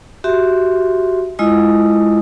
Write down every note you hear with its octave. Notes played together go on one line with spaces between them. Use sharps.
F#4 G4 E5 C6
G#3 E4 F4 D#5 D#6